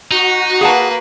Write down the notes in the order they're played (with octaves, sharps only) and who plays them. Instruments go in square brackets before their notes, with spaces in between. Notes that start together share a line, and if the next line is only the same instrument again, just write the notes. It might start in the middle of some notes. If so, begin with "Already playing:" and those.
[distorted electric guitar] D#4 [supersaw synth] F#4
[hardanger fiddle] A#3 B4 [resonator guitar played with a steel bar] G#4 F#5 A5